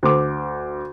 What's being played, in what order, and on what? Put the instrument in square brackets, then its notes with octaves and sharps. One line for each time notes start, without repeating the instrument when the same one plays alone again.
[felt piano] D2 D6